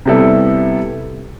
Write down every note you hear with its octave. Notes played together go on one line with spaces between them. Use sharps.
C3 G3 B3 E4 A4